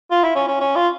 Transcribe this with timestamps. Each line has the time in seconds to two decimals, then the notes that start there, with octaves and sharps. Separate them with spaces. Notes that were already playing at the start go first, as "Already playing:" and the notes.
0.11 F4
0.24 E4
0.35 C#4
0.48 C#4
0.60 C#4
0.76 F4